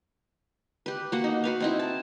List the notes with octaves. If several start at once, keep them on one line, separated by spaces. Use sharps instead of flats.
G4 B4
A#3 F#4 F#5
D#4
F#4 B4 F5
C4 D#4 E4
A5